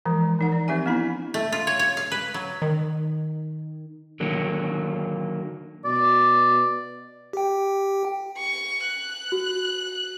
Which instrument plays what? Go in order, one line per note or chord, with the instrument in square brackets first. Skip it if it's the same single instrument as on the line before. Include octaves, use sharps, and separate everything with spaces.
[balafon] E3 F3 G#3
E3 D#4 F#5
D5
F3 C4 D#4 G4 E5 G#5
B3 D4 E4 B5
[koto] A3
F4
C#5
C#5
F5
B4
F#3
[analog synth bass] D#3
[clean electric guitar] D3 D#3 F#3 A#3
[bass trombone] B2 [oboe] D5
[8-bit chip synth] G4 G5
[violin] C#6
F#6
[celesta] F#4